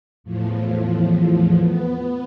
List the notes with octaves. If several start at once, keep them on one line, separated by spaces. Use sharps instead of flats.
E2 A2 F3
B3